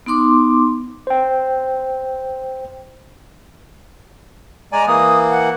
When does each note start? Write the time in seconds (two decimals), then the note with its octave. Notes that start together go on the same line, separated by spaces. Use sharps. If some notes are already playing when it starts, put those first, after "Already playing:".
0.06 B3 D#4 C6 D6
1.07 C5 G5
4.72 G#3 D5 G#5 A#5
4.87 E3 A#3 D#6
5.30 F#5